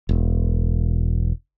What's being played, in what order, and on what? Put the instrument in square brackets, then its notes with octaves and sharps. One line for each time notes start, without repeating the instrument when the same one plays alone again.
[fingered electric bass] E1